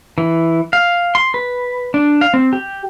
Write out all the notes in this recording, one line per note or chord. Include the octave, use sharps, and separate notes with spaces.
E3
F5
C6
B4
D4
F5
C4
G4